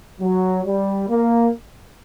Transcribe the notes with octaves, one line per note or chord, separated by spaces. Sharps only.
F#3
G3
A#3